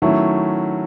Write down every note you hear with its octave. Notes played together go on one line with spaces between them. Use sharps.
D#3 F#3 A3 C#4 E4